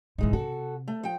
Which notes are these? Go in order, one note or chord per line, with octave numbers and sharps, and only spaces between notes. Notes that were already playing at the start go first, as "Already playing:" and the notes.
G#2 C3 E3 G#3 D#4
C3 F#4 A4
A3
F3 G5